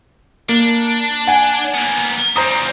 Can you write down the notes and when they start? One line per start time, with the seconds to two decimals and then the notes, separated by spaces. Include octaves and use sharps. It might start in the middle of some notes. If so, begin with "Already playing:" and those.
0.49 A#3 D4
1.27 F#5 G#5
1.74 A#3 B3
2.36 E2 G3 C5 A#5 D#6